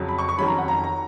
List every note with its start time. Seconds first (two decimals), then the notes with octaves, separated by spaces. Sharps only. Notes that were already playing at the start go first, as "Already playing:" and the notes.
Already playing: F2 C#3 F#3
0.08 B5
0.18 C#6
0.29 C#6
0.38 F2 D#3 F#3 C#4 B5
0.48 A#5
0.58 F#5
0.68 A#5
0.84 A#5